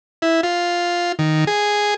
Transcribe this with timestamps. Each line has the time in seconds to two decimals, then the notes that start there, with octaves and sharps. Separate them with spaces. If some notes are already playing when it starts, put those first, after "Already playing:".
0.22 E4
0.43 F4
1.19 D#3
1.47 G#4